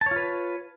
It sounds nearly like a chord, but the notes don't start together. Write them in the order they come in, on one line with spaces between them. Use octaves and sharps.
A5 C#5 F4 B4